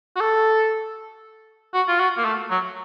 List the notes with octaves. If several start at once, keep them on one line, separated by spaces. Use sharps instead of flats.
F#4
A4
F#4
F4
F#4
A#3
A3
F#3